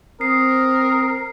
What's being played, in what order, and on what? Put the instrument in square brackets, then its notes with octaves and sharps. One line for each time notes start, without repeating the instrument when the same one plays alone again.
[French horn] C4 [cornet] A#4 [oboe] D#6 [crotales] C7